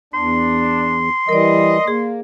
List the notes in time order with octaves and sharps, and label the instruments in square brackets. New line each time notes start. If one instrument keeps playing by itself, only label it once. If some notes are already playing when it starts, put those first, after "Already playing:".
[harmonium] E2 [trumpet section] D4 [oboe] C6
[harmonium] E3 G3 [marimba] A#4 D5 [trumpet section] D#5
[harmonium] A#3 [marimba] G#4